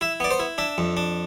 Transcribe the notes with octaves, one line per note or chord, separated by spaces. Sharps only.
E4 E5
B3 D5
C5
E4
D4 E5
F2
D4